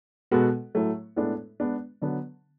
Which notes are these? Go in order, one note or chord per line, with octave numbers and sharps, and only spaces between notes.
B2 G#3 B3 F#4 A4
A2 F#3 A3
A2 G#3 B3 D4 A4
G#3 B3 D4
D3 F#3 B3 D4